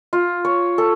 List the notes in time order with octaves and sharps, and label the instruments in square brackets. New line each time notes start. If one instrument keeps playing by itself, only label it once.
[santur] F4
C#5
A4